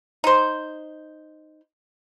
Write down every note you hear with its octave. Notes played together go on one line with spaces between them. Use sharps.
D#4 C5